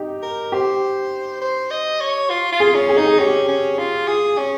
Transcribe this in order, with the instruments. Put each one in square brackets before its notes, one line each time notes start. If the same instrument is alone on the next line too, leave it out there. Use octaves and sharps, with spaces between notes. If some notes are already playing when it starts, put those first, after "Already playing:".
Already playing: [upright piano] D#4 G4
[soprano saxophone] A#4
[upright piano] G4 [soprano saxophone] C5
[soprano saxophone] C5
D#5
C#5
F4
F4
[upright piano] G#4
[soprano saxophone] C#4
[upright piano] G#4
[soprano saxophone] D#4
[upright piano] G#4
[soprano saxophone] C#4 [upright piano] G4
[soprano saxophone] C#4
F4
G#4
C#4